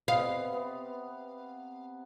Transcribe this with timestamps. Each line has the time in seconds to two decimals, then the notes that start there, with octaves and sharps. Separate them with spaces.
0.08 C3 B3 C5 F5
0.53 C3 B3